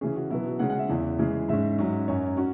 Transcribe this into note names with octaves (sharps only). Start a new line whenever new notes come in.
C#3 E3 C#4 G#4
F#4
B2 F#3 B3 E4
F#4
C#3 G#3 C#4 F#5
F#5
E5
E2 C#3 E3
C#3 E3 G#3
G#2 G#3 C#4 E5
G#2 F#3 C#4
F#2 F#3 C#4 C#5
C#4 F#4